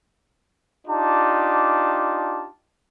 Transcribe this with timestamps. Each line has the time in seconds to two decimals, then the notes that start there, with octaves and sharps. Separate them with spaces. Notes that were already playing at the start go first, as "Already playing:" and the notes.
0.88 D4 D#4 F4 G4 A5